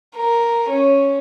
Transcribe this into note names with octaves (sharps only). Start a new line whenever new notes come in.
A#4
C#4